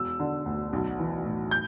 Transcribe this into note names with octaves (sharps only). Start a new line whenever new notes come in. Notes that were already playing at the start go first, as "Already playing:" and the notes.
Already playing: E1 E6
D3
D2
B1
E3
A2
G6